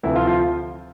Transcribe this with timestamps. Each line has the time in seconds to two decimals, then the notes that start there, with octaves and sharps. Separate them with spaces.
0.03 D2 C3 E3 F3 A3 E4
0.16 F3 F4
0.27 F3 F4